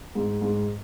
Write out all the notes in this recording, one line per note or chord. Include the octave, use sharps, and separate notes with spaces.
G#2
G#2